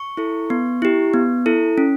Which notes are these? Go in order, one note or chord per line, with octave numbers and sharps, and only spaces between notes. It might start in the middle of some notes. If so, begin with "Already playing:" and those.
Already playing: C#6
E4 A4
B3
E4 G4
B3
E4 A4
C#4